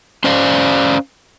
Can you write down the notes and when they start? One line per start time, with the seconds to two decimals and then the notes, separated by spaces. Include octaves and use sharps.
0.24 C#4 C5 D5 F5